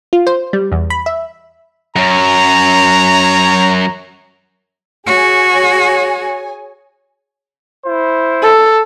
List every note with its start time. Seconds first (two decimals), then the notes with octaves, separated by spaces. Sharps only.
0.13 F4
0.27 C5
0.53 G3
0.72 E2
0.90 B5
1.06 E5
1.96 F#2 C#5 A#5
5.07 F#4 G#4 C#5 G#5
7.86 E4 C5
8.42 A4